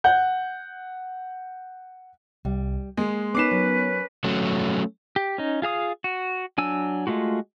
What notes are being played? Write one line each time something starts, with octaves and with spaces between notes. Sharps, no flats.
F#5 G6
C2 G3
G#3 A#3 G#4 C6
B3 C#4 D#4 A#4 B4 D6 C7 E7
F#3
F#3 A3 C#4
G4
C#4 D#4
F4 G#4 F5 D#6
F#4
F#3 D4 G#5 E6
G#3 A3 F4 F#4